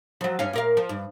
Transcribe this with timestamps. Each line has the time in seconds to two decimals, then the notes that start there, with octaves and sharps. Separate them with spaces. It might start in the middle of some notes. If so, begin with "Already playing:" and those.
0.21 F3 F#3
0.39 G2 C#4 F5
0.53 A#2 A#4 F5
0.77 F3
0.89 G2